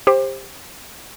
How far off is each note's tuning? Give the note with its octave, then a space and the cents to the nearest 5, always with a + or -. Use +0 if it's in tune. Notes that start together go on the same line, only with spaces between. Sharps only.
G4 +20 C5 +20